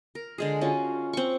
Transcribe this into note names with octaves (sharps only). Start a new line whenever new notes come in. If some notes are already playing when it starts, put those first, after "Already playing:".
A#4
D3 G#3 G#4
C#4 F4 F#4
C4 C#6